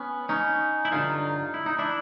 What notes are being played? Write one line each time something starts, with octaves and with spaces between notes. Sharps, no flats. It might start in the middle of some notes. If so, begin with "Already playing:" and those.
Already playing: B3 C#4
C#4 D#4
E4
G2 D3 F#3 D#4 F4
E4
D#4
D4 E4